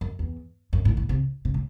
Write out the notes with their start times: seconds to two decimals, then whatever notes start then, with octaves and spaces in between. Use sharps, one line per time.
0.01 F#2
0.19 E2
0.73 F#2
0.85 A2
0.97 A2
1.09 C3
1.45 C3
1.54 A2